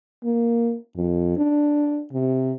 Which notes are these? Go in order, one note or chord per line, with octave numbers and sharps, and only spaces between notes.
A#3
F2
D4
C3